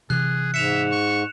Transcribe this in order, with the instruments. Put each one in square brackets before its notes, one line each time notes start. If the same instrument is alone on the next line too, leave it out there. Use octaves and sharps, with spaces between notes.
[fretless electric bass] C3 E3 [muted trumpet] G#4 [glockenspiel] F#6
[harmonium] G#2 [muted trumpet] E5 [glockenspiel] C#7 E7 F7
[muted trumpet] C#6